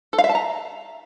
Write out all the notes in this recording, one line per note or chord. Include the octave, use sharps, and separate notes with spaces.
A4
F5
E5
A5
A#5